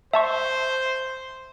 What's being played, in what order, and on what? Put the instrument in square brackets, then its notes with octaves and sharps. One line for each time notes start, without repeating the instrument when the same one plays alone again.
[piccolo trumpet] C5 [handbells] E5 A5 C#6